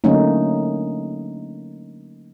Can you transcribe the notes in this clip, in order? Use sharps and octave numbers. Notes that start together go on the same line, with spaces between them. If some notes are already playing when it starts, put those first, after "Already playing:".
D3 F#3 A3 A#3 C#4 D#4